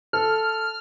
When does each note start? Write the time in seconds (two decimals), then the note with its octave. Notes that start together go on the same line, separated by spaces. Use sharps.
0.13 A4 F6